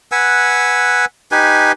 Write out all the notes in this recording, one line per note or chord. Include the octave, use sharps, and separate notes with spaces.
B4 F#5 G#5 E6
D#4 G4 B4 G#5